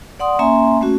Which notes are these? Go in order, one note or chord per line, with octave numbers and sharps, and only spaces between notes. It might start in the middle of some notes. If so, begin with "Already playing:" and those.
D5 F#5 C6 D#6
A#3 C#4 E5 G#5 A#5 C6
A3 C#4 F#4